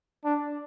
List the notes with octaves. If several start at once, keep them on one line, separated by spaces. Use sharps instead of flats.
D4